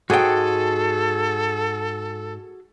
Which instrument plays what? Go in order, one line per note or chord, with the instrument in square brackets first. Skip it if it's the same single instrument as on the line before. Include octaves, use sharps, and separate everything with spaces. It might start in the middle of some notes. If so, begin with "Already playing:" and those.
[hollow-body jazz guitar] G#2 G5 [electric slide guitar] F#4 G#4 [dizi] A4